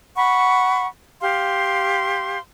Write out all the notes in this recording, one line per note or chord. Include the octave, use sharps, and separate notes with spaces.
F#5 B5 C#6
G4 F5 C6